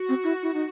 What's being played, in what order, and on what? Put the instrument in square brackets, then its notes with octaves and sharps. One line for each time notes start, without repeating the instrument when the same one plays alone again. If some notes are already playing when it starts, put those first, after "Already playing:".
Already playing: [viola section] F#4
[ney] C4
E4
E4
D#4